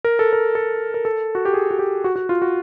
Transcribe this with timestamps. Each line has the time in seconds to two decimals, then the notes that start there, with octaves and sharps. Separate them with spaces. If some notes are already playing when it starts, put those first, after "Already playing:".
0.05 A#4
0.19 A4
0.33 A#4
0.55 A4
0.94 A#4
1.05 A4
1.35 F#4
1.45 G4
1.54 G#4
1.71 F#4
1.79 G4
2.04 F#4
2.16 F#4
2.29 F4
2.42 F#4